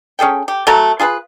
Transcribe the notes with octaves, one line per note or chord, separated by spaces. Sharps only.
C#4 G#4 A4 G5
G4
F#3 A3 A4 A#5
F4 G#4 A4 B4